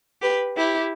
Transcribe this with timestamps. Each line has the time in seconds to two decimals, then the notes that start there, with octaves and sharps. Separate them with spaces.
0.21 G4 B4
0.56 E4 G4